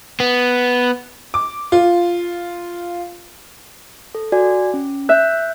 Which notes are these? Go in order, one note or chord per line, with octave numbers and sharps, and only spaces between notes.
B3
D6
F4
A4
F#4 D5 G#5
C#4
E5 F#6 G6